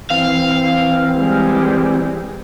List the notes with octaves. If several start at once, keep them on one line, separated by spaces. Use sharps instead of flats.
E3 C4 F5
G3 G#3